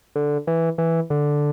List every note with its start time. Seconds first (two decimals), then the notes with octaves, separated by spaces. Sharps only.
0.16 D3
0.47 E3
0.78 E3
1.10 D3